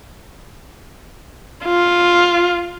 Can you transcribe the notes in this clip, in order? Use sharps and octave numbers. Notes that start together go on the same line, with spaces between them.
F4